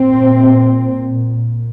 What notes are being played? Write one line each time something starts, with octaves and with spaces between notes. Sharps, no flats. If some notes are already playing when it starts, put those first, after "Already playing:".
Already playing: A#2 C4